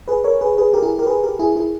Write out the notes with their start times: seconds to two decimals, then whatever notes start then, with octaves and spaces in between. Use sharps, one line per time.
0.08 G#4 B4
0.24 A#4 C#5
0.41 G#4 B4
0.57 G#4 B4
0.73 G4 A#4
0.83 E4 G#4
0.99 G4 A#4
1.06 G#4 B4
1.23 G4 A#4
1.39 E4 G#4
1.56 E4 G#4